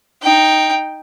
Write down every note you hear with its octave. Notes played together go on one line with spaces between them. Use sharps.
D#4 G5